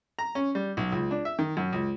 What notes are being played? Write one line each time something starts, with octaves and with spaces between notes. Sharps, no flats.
A#5
C#4
G3
B1
C#2
D4
E5
D#3
F#2
C#2